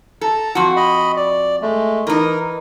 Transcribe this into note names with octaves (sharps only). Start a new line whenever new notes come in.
A4 A5 A#5
F2 F#4
D#5 B5
D5
G#3 A3
E3 D#4 A#4